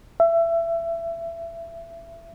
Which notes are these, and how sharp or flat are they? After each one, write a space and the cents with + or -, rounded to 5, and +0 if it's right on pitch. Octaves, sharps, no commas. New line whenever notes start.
E5 +25